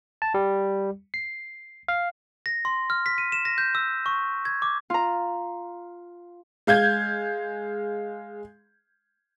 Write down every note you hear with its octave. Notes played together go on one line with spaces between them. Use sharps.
A5
G3
C7
F5
A#6
C6
F6
B6
D#7
E7
A#6
G6
E6
C#6
G#6
D6
F4 A#5
G#3 F5 G6 G#6